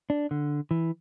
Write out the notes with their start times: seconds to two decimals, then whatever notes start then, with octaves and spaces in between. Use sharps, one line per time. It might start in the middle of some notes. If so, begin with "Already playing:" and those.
0.10 D4
0.31 D3
0.71 E3